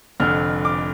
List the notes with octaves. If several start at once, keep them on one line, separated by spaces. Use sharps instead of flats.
F1 F2 D3 F6
D6